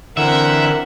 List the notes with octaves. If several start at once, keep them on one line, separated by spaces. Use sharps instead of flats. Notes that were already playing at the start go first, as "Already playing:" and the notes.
D3 E3 C4 A#4 E5 F#5